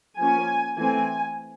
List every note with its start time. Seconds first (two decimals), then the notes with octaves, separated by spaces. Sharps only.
0.18 F3 A#3 C#4 G#5
0.77 E3 A3 C4 G#5